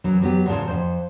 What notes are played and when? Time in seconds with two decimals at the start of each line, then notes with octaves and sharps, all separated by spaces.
0.04 F#2 E3 F#3
0.22 F#3 B3 G4
0.46 E2 G#2 C#3 F4 A5
0.68 F2 C5